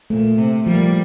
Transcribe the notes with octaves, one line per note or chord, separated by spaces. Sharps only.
A#2 A3
C3
F3 G3 A#3